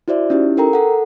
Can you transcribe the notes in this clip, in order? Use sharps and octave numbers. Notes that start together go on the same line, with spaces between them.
E4 F#4 C5 D5 E5
C#4 D#4 E4 G4
A4 A#4 G5 A#5
A4 F#5